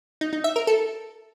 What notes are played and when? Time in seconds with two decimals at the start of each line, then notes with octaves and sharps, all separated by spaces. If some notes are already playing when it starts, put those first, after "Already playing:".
0.21 D#4
0.33 D#4
0.44 E5
0.56 A#4
0.67 A4